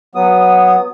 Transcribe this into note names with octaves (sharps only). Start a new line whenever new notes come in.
F#3 B3 D#6